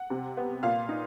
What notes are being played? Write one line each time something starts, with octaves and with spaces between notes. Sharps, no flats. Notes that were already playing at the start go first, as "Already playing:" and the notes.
Already playing: F#5
C3
B3
A#2 F5
D#4